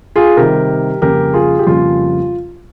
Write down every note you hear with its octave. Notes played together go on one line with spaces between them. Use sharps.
F4 G#4
C3 D#3 G3 G4 A#4
F2 C#3 G3 A#3 C#4 G4 A#4
F4 G#4
G4
F2 C#3 G3 A#3 C#4 F4